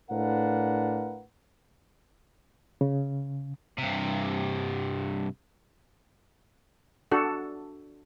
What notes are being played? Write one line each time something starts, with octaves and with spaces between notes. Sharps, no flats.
A2 D4 A#4 B4 F5 F#5
C#3
G2 C3
D4 F#4 A4